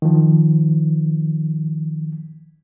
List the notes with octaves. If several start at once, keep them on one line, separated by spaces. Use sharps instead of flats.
D#3 F3